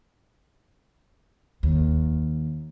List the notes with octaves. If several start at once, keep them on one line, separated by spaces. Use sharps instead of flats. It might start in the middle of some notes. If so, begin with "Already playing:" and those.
D#2